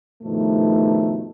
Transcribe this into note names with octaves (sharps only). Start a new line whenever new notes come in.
G2 B2 D#3 F3 A3